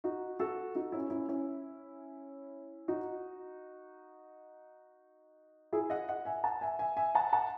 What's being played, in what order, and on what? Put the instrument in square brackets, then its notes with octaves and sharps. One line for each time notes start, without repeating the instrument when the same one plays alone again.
[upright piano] D#4 F#4
F#4 A4
D#4 F#4
C#4 E4
C#4 E4
C#4 E4
D#4 F#4
E4 G#4
D#5 F#5
D#5 F#5
E5 G#5
F#5 A5
E5 G#5
E5 G#5
E5 G#5
F#5 A5
F#5 A5